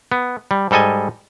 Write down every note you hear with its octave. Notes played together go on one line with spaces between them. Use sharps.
B3
G3
G#2 G3 A4 D#5 G#5